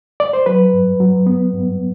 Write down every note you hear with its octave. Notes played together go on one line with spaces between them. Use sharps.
D5
C5
F#3 B4
G2
F#3
B3
G2